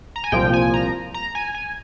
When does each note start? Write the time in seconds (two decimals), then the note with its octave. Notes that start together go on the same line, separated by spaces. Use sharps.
0.16 A#5
0.24 G#5
0.32 C2 A#2 F3 G5
0.53 G#5
0.74 A#5
1.14 A#5
1.35 G#5
1.55 G#5